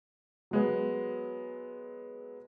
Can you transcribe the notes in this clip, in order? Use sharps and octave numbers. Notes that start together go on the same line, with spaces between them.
F#3 G#3 B3